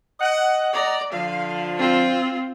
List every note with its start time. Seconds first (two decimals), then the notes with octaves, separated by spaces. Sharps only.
0.20 D#5 F#5
0.73 D5 D#5 F#5 A#5
1.13 D3 F3 F5
1.79 C4 F4